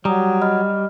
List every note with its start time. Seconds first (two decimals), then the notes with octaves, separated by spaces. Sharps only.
0.05 F#3 G3 A#5 D#6
0.42 D#5 B5 F6